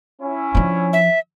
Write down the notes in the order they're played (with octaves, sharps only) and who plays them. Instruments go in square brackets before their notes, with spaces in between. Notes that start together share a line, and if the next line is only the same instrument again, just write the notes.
[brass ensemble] C#4 E4
[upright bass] F3 D4
[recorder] E5